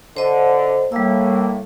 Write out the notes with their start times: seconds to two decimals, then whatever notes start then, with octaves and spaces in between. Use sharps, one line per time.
0.17 D3 C5 D#5
0.92 A2 G3 A#3 E6